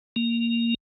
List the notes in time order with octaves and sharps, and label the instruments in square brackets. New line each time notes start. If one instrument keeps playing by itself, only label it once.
[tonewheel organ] A#3